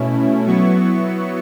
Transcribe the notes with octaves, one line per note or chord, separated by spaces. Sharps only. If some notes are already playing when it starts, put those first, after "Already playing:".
Already playing: B2 A3 C#4 E4
F#3 B3 E4 C#6